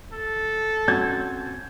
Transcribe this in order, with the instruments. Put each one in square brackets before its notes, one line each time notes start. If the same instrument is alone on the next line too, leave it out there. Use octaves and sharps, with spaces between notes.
[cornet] A4
[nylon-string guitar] C4 C#4 F#4 [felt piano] G6 G#6